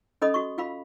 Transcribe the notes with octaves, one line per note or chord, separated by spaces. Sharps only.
C#4 A4 D#5 B5 D#6
F#4 C#6
F4 F5 B5